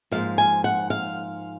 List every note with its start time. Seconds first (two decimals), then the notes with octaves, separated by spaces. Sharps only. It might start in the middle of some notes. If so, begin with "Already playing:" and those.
0.11 G#2 F3 A#3 F5
0.38 G#5
0.64 F#5
0.90 F5